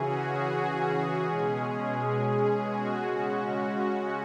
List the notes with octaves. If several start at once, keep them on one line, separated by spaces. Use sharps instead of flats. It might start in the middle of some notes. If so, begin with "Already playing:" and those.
Already playing: C#3 E3 C#4 F#4 G#4
G#4
B2 G#3 C#4
G#4
F#4
C#3 G#3 C#4
F#4
F#4